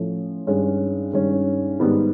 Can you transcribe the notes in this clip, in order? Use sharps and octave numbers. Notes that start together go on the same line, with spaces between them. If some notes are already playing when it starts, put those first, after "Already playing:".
Already playing: A2 F3 A3 C#4
G2 D#3 G#3 C#4
G2 D#3 G#3 C#4
G#2 D#3 G3 B3